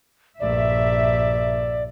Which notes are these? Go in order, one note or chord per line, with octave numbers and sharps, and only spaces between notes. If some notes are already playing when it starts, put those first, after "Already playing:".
A#1 G2 D5 E5